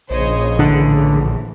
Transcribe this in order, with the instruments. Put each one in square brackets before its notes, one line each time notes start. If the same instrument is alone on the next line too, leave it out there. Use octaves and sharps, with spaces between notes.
[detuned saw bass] A#1 [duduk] C#3 [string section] C5 C#5 D#5
[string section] A2 E3 [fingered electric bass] D3